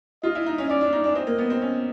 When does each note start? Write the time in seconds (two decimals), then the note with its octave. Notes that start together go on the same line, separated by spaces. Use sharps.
0.23 F4 D#5
0.35 E4
0.46 D#4
0.58 C#4
0.69 C#4 D5
0.81 D4
0.93 D#4
1.04 D4
1.15 C4 D#5
1.27 A#3
1.38 B3
1.50 C4
1.61 C#4